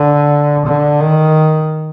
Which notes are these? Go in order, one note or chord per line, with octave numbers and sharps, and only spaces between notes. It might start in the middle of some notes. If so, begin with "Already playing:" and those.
Already playing: D3
D3
D#3